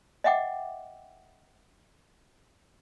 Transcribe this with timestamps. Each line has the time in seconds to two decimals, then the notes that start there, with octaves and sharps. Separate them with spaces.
0.24 D#5 E5 F#5 G5 D6